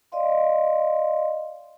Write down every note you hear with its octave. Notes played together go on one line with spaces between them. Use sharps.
D5 D#5 F5 C6